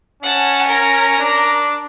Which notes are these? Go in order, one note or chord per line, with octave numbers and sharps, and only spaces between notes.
C#4 F#5 A5
A#4 A#5
D4